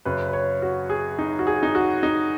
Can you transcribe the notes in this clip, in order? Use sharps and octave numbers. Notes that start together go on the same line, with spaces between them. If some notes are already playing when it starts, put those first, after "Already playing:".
F#2 C#3 B4
B4
C#5
F#4
G#4
D#4
F#4
G#4
D#4
F#4
D#4